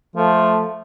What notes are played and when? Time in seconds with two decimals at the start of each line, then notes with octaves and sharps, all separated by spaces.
0.16 F3 A3